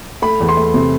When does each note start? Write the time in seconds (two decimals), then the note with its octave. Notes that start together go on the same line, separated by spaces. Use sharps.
0.22 A3 B5
0.40 E2
0.49 C6
0.57 A3
0.74 C3